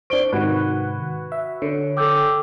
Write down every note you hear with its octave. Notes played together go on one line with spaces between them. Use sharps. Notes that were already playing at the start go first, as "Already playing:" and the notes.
D4 C5 C#6 D7 G7
G#2 C3 D#3 F#4 B4 F#6 G#6
E5
D3 C#5
A4 G5 D6 E6 G6